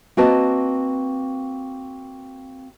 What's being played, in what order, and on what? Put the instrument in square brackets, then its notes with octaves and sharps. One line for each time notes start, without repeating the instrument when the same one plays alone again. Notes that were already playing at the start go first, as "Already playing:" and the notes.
[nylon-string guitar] A#3 C4 F#4 B4 D#5 A5